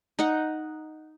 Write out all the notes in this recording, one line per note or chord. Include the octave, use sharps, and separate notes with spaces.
D#4 D#5 F#5